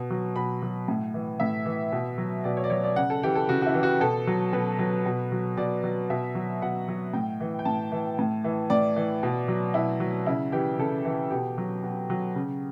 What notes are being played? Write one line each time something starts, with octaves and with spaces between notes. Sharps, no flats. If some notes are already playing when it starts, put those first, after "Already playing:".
Already playing: B2
F#3
B2 B5
F#3
A2
E3
A2 E5
E3
B2
F#3
B2 D5
C#5
D5
F#3 C#5
D5
C#3 F#5
A4
E3 G4
A4
C#3 F#4
F#4
E4
E3
F#4
B2 A4
F#3
B2 B4
F#3
B2
F#3
B2 D5
F#3
B2 E5
F#3
B2 F#5
F#3
A2 G5
E3
G5
A2 A5
E3
A2
E3
A2 D5
E3
B2
F#3
B2 E4
F#3
C#3 E4
E3 G4
C#3 A4
E3
B2 G4
F#3
B2
F#3
C#3